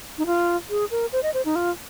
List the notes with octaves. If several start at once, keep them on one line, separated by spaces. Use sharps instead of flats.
D#4
F4
G#4
A#4
C5
D#5
C5
D#4
F4